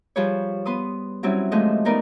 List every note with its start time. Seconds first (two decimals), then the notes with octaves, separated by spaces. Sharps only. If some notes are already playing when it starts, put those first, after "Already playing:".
0.16 F3 G3 G#4 B4 C#5
0.65 B3 B4 C6 D#6
1.23 F#3 G3 C4 C#4 E4
1.52 E3 F3 G#3 A3 D#5
1.85 A3 B3 D#4 A#4 B4 D5